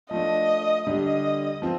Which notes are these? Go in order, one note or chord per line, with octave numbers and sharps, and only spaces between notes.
F3 A3 D4 D#5
D3 G3 D4 D#5
F3 C4